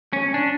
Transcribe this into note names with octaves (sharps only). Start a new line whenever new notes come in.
C#4
D4